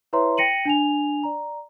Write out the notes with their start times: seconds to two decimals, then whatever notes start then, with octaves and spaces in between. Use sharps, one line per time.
0.13 E4 B4 C#5 E5 A#5 C6
0.37 G5 A#6 C#7 D#7 F#7
0.65 D4 G#5 F7
1.23 D5 A#5